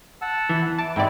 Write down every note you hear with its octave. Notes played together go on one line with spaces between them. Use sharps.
F#5 A5 E6
E3
E2
E3 A5 D6
D#2 G#2 C4 E4 D5